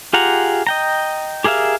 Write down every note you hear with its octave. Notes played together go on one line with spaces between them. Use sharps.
F4 G4 G#4 F#5 A#5
D#5 G5 A#5
G4 G#4 A#4 E5 F5